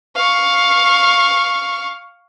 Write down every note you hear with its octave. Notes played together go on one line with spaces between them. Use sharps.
F5 C#6